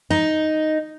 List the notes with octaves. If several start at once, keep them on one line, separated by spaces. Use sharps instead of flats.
D#4